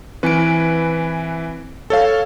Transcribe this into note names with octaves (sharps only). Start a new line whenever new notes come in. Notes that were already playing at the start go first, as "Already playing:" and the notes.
E3 C4 B4 G#5 D7
A4 C#5 F5